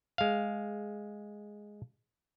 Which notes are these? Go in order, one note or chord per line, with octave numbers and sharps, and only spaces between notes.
G#3 F5